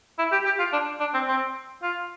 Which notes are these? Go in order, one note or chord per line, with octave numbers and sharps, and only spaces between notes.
E4
G4
G4
F4
D4
D4
C4
C4
F4